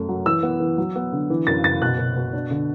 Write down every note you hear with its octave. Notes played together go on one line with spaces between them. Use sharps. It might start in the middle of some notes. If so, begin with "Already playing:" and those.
Already playing: F#2 A3
F#3
E3 E6
B3
E3
F#3
B3
D3
E3
F#2 A6
F#1 A6
B2 F#6
B2
B2
D4
D3